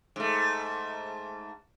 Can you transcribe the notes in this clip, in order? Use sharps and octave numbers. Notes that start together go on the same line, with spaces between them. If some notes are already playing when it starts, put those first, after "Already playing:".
G#2 A3